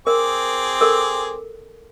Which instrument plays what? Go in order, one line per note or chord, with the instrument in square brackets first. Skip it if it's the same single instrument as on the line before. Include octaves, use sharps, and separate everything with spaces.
[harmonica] C4 G#4 D6 [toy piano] A#4
[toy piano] A4 A#4